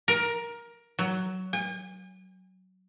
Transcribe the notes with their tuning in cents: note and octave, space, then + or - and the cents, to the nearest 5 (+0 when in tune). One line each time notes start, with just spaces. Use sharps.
A#4 +15
F#3 +10
G#5 -40